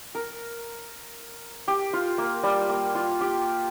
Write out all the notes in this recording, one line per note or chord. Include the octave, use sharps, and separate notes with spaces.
A#4
G4
F4
A#3
G3
A#3
F4
G4